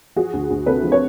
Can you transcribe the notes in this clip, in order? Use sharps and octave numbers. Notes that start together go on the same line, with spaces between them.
F3 F#4 G#4
D2
D2
C3 A4 B4
F3
B4 C#5